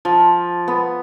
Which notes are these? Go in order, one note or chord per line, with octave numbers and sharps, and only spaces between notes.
F3
B3